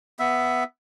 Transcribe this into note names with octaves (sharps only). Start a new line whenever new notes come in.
B3 E5